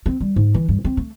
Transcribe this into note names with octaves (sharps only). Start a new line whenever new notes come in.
C4
G3
G#2
E3
G2
C4
A3